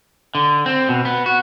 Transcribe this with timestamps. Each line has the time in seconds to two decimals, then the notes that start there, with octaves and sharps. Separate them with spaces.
0.35 D3
0.66 C4
0.89 B2
1.05 B3
1.26 F#4